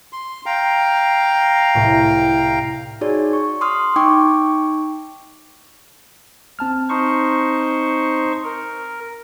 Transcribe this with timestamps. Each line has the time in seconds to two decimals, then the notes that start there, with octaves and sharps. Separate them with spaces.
0.13 C6
0.46 F5 G5 A#5
1.75 C2 A2
3.01 D#4 F#4 G#4 C#5 D5
3.33 C#6
3.61 C6 D#6 F6
3.96 D#4 G5 C#6 D6
6.59 C4 A5 F6
6.89 D#4 C5 C#6
8.44 A#4